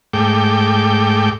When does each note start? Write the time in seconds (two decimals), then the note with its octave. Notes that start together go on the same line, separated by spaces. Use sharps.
0.13 G#2 A3 G5 D6